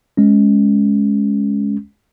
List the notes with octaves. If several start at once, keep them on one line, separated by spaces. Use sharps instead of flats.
G#3 C#4